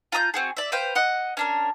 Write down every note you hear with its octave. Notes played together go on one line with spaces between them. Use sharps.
F4 A#5 D#6 G6
C4 F#4 G#4
D5 E5
B4 C5 F5 G5
D#5 F#5
C#4 D4 A#4